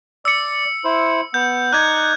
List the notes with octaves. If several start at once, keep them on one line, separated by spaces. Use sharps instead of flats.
D5 E6 C#7
E4 C5
B3 G6
D#4 D5 A#5 F#6 G#6